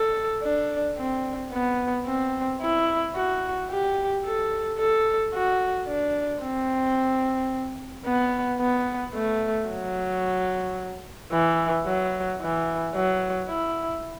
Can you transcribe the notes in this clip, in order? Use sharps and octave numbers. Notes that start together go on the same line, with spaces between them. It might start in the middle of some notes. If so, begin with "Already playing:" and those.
Already playing: A4
D4
C4
B3
C4
E4
F#4
G4
A4
A4
F#4
D4
C4
B3
B3
A3
F#3
E3
F#3
E3
F#3
E4